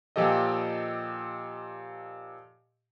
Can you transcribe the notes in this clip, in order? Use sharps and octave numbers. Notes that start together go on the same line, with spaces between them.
A#2 F3 G4 A4 D#5